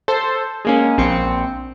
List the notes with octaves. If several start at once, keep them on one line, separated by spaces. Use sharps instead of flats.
A4 C5
G#3 A#3 C#4
A#1 C4 C#7